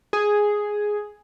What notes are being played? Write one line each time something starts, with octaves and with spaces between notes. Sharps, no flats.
G#4